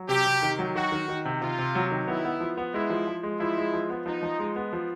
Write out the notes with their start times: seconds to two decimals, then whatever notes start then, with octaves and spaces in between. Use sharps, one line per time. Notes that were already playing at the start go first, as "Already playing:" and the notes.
Already playing: F#3
0.09 C3 G4
0.26 C3
0.42 D#3
0.59 F#3
0.75 D#3 F#4
0.92 D#3
1.08 D#3
1.25 C3
1.41 C3 F4
1.59 C3
1.75 F#3
1.91 D#3
2.08 B3 E4
2.25 B3
2.40 F3
2.57 B3
2.74 G#3 E4
2.90 F3
3.07 F3
3.23 G#3
3.40 F3 E4
3.57 G#3
3.74 F3
3.90 B3
4.06 F3 D#4
4.23 F3
4.39 G#3
4.56 B3
4.73 F3